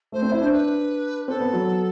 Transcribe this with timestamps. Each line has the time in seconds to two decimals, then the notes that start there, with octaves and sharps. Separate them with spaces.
0.12 A3 C5
0.22 C4
0.32 E4
0.41 D4
0.51 B4
1.28 C4 A4
1.40 B3
1.53 F#3